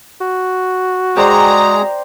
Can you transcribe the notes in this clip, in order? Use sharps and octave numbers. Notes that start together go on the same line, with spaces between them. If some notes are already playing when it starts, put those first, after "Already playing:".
F#4
G#3 G#4 C5 D5 G5 A#5